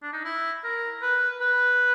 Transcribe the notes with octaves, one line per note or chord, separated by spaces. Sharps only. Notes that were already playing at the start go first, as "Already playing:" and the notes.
D4
D#4
E4
A#4
B4
B4